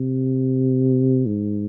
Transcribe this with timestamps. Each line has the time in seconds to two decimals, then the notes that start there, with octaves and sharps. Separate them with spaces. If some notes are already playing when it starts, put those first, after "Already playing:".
Already playing: C3
1.26 G#2